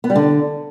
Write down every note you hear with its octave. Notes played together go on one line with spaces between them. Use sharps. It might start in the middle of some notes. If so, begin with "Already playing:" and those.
B3
G3
D3